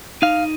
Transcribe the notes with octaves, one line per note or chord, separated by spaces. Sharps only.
D#4 F5